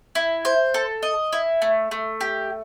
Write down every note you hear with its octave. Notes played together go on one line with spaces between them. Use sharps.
E4
C5
A4
D#5
E4
A3
A3
G4